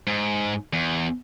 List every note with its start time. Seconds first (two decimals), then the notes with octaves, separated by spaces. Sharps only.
0.07 G#2
0.73 E2